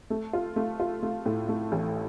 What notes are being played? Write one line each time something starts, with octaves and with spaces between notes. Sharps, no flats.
A3
F4
A3
F4
A3
A2
A3
A1